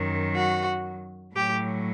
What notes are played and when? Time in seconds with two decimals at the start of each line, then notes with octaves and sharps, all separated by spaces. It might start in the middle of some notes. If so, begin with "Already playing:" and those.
Already playing: F#2 D#3 F#3
0.34 F#4
1.36 A2 F#3 G4